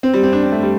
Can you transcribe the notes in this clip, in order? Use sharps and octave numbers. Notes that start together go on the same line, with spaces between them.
C4
G3
C4
D4
C4
A3
G3